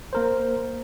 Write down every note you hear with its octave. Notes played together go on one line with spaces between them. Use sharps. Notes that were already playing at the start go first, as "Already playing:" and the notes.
A#3 A#4 C5